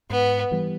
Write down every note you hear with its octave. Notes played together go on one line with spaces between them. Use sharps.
G#2 B3
E3 G3 B3